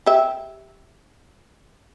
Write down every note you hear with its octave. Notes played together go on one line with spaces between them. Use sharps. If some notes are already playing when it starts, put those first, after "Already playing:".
G4 E5